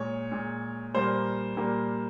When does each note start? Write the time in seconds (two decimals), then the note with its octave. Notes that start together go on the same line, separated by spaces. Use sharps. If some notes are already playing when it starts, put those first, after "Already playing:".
Already playing: A#2 G#3 C#5
0.32 A#2 G#3
0.94 A#2 G3 A#3 C5
1.57 A#2 G3 A#3